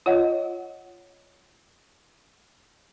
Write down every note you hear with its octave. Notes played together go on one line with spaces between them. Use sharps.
F4 C#5 D#5 F#5